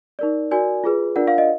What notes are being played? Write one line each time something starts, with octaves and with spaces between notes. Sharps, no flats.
D#4 A#4 D5
F#4 A#4 D5 G#5
F4 G#4 B4
D4 F4 A#4 D5 F#5
F5
D#5